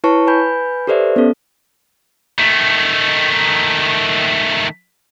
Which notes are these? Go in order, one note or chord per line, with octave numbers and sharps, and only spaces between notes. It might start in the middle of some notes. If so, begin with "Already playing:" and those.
E4 B4 C#5 A5 C#6
B4 G#5 B5 G6
G4 A4 B4 C5 D5 E5
B3 C#4 A4
D#3 A3